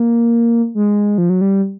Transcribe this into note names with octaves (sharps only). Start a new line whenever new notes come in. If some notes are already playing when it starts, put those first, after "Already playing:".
Already playing: A#3
G#3
F3
F#3
G3